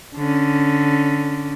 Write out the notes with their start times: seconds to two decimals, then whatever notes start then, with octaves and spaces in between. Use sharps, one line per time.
0.16 D3 C#4